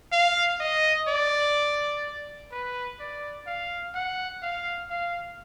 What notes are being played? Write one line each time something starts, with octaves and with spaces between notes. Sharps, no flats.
F5
D#5
D5
B4
D5
F5
F#5
F5
F5